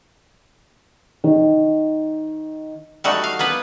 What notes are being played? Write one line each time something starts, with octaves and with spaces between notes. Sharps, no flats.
D#3
G3 A3 D#4 F#4
F5
A#3 B3 B4